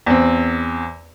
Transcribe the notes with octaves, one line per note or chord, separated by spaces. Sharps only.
E2 C4